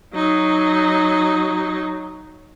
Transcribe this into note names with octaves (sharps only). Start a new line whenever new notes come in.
F#3 D#4